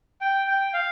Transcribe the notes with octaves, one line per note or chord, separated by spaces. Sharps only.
G5
G5
F5